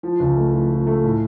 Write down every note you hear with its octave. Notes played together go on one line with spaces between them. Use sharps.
F3
C#2
A3
F3
F3
A3
A2